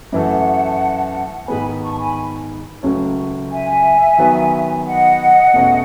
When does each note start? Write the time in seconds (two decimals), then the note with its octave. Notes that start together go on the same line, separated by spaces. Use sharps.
0.12 F#2 E3 A3 F#5 A5
1.48 G#2 D#3 G#3 B3 G#5 B5
1.82 A5 C#6
1.92 A5
1.99 G#5 B5
2.83 C#2 C#3 F#3 A3 C#4
3.51 E5 G#5
4.18 D#3 F#3 B3
4.86 D#5 F#5
5.54 E2 B2 A3 C#4